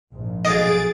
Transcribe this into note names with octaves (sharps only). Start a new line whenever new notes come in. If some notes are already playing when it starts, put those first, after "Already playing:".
A#1 G#2
B1 G#4 D#5 F5 F#5 A6 D7